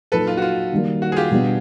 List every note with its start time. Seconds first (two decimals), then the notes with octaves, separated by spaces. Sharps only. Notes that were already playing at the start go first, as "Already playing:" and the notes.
0.12 A#2 F#3 A#3 D#4 A4 B4
0.27 F4
0.37 F#4
0.42 F4
0.72 D#3 G3 A#3
1.02 F#4
1.12 G#4
1.16 F4 G4
1.31 B2 G3 B3 D4